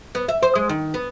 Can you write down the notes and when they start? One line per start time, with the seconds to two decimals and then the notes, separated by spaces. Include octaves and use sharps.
0.15 B3
0.29 E5
0.42 C5
0.55 G#3
0.69 D#3
0.94 B3